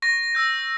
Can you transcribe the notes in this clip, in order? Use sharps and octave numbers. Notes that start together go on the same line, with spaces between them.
C#6 A#6
E6 G6